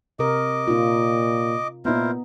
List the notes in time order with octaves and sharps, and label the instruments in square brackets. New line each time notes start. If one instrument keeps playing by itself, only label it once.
[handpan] C3 A#4 [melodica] D#5 D6
[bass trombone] A#2 [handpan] D#4 F4
[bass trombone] A#2 [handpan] B3 D#4 [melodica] E4 A#4 C5